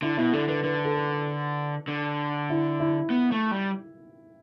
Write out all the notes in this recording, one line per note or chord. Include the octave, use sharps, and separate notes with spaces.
D3 E4
B2 E4
D3 A4
D3 B4
D3 B4
A4
B4
D3
E4
E4
B3
A3
G3